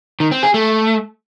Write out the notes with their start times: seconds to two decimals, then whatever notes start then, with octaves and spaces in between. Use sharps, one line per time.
0.20 D#3
0.31 C4
0.43 G#4
0.54 A3